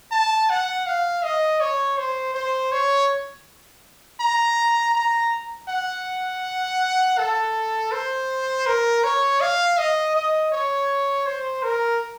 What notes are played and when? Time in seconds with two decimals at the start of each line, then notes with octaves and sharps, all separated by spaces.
0.11 A5
0.50 F#5
0.87 F5
1.23 D#5
1.60 C#5
1.98 C5
2.34 C5
2.72 C#5
4.20 A#5
4.95 A#5
5.69 F#5
7.18 A4
7.92 C5
8.66 A#4
9.04 C#5
9.41 F5
9.78 D#5
10.15 D#5
10.52 C#5
11.27 C5
11.63 A#4